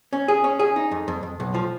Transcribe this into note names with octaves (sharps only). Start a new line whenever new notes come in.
C#4
G#4
C#4
G#4
D#4
F2
F2
F2
B1
F3